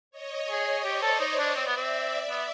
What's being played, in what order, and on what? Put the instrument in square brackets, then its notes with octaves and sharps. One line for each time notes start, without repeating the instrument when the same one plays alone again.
[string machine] C#5 D#5
[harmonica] G#4
[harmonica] G4 [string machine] C5 D5
[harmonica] A4
D#4
D4
[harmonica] C4 [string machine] D5 E5
[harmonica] B3
C4
B3